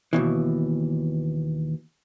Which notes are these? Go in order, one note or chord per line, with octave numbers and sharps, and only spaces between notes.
D#2 B2 E3